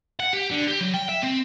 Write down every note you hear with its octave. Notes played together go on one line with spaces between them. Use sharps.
F#5
G4
D3
G4
F#3
G5
E5
C4